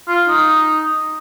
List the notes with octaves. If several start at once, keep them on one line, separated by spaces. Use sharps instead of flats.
F4
D#4